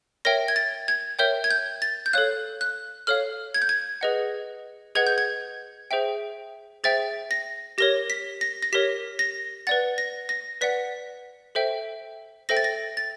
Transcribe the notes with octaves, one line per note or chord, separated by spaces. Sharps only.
A#4 C#5 E5 G5 A#6
G#6
A6
G#6
A#4 C#5 E5 G5 G6
G#6
G6
A6
G6
A4 C#5 F5 F#6
F#6
A4 C#5 F5 F6
G#6
G6
G#6
G#4 B4 D#5 F#5
G#4 B4 D#5 F#5 G#6
G6
G#6
G#4 C5 E5 G5
G#4 C5 E5 G5 A6
A#6
G4 A#4 C#5 A#6
B6
A#6
A#6
G4 A#4 C#5 B6
A#6
B4 D5 F#5 A6
A#6
A#6
B4 D5 F#5 B6
A4 C5 E5 G5
A4 C5 E5 G5 A#6
A6
A#6
A6